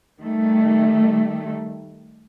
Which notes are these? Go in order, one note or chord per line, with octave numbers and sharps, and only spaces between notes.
D#3 G3 A3